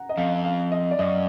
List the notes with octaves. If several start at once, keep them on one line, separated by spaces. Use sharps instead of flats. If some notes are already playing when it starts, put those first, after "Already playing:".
Already playing: F#5 A#5
D#5
F2 F5
F5
D#5
D5
F#2 D#5